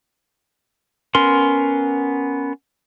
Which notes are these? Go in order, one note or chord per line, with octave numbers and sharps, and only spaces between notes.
B3 C#4 A#4 C6